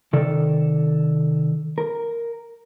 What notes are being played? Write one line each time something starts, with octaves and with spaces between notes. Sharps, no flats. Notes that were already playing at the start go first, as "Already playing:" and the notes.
C3 D#3 A4 D5
A#4